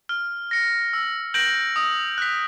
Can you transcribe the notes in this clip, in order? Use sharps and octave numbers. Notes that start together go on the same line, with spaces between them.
F6
A#6 C#7
E6
G6 A#6 D7 F#7
D#6
F#6 B6